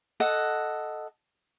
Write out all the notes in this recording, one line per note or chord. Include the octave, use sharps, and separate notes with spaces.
A4 D#5 F#5